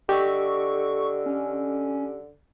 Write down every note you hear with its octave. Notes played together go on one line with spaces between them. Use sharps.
D3 G4 A4 D#5 C#6
C#4